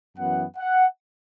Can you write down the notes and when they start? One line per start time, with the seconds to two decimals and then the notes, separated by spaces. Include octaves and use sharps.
0.17 F#2 E3 B3 F#5
0.57 F#5